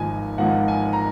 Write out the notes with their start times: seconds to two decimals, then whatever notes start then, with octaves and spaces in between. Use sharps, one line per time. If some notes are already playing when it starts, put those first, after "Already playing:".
Already playing: G#1 G#2 F3 A#3 D#4 G#5
0.38 G#1 G#2 F3 A#3 D#4 F#5
0.68 G#5
0.93 A#5